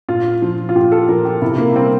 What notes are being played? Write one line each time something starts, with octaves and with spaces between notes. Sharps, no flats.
A#2 F4
F3
F4
A#2 G4
A4
F3 A#4
G4
C3 E4
A#3
G3 C4